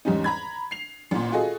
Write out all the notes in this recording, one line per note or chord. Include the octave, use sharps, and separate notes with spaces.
E2 G#2 G3 C#4 D#4
A#5 B5 G#6
C7 F7
A1 A#2
F4 F#4 G#4 A4 D#5